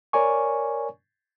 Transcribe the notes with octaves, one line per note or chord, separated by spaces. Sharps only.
A#4 C#5 D5 G#5 C#6